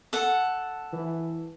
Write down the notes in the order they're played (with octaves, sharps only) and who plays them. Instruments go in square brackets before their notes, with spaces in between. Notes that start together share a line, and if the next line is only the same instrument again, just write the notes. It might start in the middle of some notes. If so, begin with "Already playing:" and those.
[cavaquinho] A4 F#5
[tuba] E3